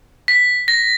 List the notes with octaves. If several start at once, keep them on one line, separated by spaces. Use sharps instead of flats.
B6
A#6